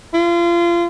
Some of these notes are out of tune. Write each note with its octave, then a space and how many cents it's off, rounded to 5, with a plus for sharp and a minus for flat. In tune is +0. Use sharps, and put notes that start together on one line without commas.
F4 -30